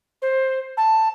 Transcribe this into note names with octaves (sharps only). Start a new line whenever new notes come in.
C5
A5